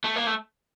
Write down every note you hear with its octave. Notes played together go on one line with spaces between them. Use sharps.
A3
A#3
A3